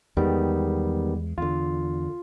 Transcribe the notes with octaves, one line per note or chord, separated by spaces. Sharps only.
E2 D#3 G3 G#3 B3
E2 D3 F4